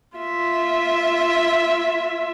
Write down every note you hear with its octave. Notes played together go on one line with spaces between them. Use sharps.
F4 E5